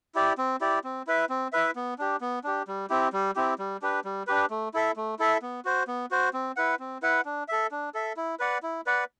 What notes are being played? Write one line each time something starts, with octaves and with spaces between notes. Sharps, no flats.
E4 G4 D5
C4
E4 G4 D5
C4
E4 B4 E5
C4
E4 B4 E5
B3
D4 G4
B3
D4 G4
G3
C4 E4 G4
G3
C4 E4 G4
G3
D4 G4 B4
G3
D4 G4 B4
A3
E4 A4 E5
A3
E4 A4 E5
B3
F#4 C5
B3
F#4 C5
C4
E4 B4 F#5
C4
E4 B4 F#5
D4
A4 E5
D4
A4 E5
E4
B4 D5 F#5
E4
B4 D5 F#5